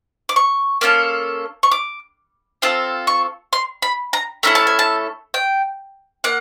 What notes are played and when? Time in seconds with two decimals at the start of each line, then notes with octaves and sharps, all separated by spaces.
0.29 D6
0.36 C#6
0.81 A#3 C#4 F4 A4
1.63 C#6
1.71 D6
2.62 C4 F4 A4 D#6
3.07 C#6
3.53 C6
3.82 B5
4.13 A#5
4.43 A3 C#4 E4 A4 A#5
4.55 A5
4.67 G#5
4.79 A5
5.34 G5
6.24 A#3 F#5